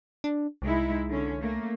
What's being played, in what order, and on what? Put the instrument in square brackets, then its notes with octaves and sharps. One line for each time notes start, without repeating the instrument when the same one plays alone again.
[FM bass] D4
[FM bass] C2 [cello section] G#3 D#4 E4
[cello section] D3 C#4
A3 A#3